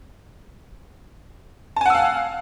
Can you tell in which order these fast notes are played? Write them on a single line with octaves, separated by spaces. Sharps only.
A5 G#5 F#5 E6 F5